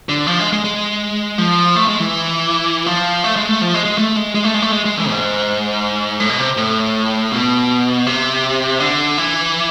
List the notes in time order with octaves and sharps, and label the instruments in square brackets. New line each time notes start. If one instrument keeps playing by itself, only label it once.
[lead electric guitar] D3
F3
G#3
G#3
G#3
F3
A3
G#3
E3
F3
A3
G#3
A3
F3
G#3
G#3
A3
G#3
G#3
A3
G#3
A3
G#3
G#3
E3
G#2
A2
B2
C3
A2
B2
C3
D3
E3